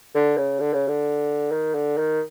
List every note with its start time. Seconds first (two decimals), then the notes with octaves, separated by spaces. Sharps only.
0.15 D3
0.37 C#3
0.60 D3
0.74 C#3
0.88 D3
1.52 D#3
1.75 D3
1.98 D#3